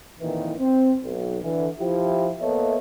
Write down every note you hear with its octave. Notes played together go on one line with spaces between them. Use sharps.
F2 A#2 D#3 E3
C4
B1
D3 E3
F3 E4 G4
A#3 B3 A4 C#5 D#5 E5